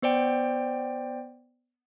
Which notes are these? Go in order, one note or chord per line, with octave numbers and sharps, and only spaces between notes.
B3 C5 D5 G5